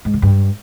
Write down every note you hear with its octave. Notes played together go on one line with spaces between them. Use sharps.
G#2
D3
G2